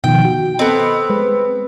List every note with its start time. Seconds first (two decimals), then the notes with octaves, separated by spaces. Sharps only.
0.04 B2 D#3 F3 G5
0.25 F#4
0.59 B3 C4 A4 D#5
1.10 G#3 B4